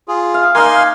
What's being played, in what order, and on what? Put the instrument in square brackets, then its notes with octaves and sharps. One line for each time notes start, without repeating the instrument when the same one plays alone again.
[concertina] F4 G#4
[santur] F5
[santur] A#3 D#4 [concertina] F5 G#5 C6